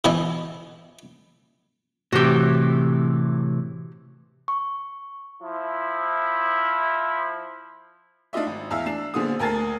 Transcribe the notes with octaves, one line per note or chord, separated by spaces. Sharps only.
B2 E3 E4 D#5 G#5
A2 C3 E3 F#4 G4
C#6
F3 E4
D4 D#4 F4 D#5 E5
G#1
E2 E4 F5 E6
D4 C7 E7
A#2 D3 F3 B3 G#4 D#6
D2 A#4 G#5 A5 A6 C7